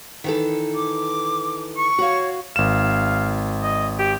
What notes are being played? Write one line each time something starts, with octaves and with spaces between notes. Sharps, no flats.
D#3 E3 A4
D6
C#6
F#4 C#5 F5
G#1 F5 E7
D#5
G4